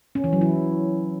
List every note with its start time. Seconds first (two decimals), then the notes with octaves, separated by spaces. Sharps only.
0.15 C#4
0.24 E3
0.33 F#3
0.41 E4